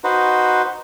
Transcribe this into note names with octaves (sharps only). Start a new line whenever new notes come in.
D#4 F#4 B4 C5